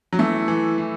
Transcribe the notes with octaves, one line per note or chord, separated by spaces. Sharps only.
F#3
E3 A3
E3
E3